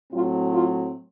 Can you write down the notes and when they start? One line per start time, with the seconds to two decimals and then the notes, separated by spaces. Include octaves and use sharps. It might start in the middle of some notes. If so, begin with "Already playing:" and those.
0.11 A2 F#3 C4 F4
0.52 F4